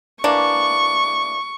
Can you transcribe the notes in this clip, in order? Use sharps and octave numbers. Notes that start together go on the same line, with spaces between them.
E3 A#3 D4 C#6